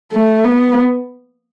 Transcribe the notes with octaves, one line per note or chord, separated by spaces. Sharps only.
A3
B3